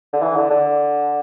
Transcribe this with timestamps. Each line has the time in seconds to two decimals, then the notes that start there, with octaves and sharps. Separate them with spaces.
0.13 D3
0.22 E3
0.36 D3
0.50 D3